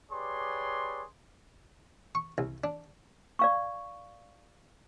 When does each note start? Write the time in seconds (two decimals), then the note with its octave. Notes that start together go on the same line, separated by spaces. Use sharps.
0.11 G4 G#4 B4 C#5 D5 C6
2.15 C#6
2.38 C2
2.64 D4
3.39 D5 F5 C#6